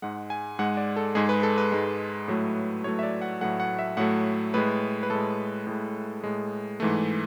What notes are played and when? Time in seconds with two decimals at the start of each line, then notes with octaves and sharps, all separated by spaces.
0.02 G#2 G#3 F#5
0.30 G#5
0.59 G#2 G#3 F#5
0.77 D5
0.96 A4
1.15 G#2 G#3 G#4
1.29 B4
1.43 A4
1.58 B4
1.72 G#2 G#3
2.28 A2 F#3 A3
2.84 A2 F#3 A3 C#5
2.99 E5
3.03 D5
3.22 F#5
3.41 A2 F#3 A3 F#5
3.60 F#5
3.79 E5
3.97 A2 F#3 A3 F#5
4.54 A2 G#3 B4
5.03 B4
5.10 A2 G#3 A4
5.67 A2 G#3
6.24 A2 G#3
6.80 G#2 E3 A3